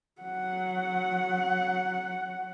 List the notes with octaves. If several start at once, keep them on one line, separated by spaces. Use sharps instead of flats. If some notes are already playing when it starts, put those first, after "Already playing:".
F#3 F#5